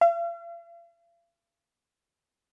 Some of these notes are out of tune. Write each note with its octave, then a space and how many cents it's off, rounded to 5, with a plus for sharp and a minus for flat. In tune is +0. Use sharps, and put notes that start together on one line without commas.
F5 -45